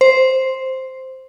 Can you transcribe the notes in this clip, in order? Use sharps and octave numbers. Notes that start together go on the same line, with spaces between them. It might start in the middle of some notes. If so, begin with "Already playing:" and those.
C5